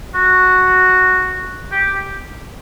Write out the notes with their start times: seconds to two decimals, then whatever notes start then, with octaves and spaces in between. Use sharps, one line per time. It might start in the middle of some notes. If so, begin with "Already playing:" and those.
0.15 F#4
1.72 G4